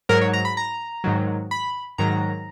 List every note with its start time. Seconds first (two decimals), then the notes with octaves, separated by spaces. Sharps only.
0.09 G#2 F#3 A#4
0.21 C#5
0.33 A#5
0.45 B5
0.57 A#5
1.04 G#2 D#3 F#3
1.51 B5
1.98 G#2 D#3 F#3 A#5